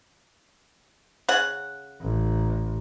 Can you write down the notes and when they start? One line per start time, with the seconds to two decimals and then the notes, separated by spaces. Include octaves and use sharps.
1.29 C#3 F#5
2.01 A1